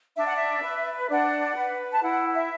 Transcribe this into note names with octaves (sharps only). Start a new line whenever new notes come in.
D4 E5
F#5
E5
B4
D4 F#5
B4
A5
E4 F#5
E5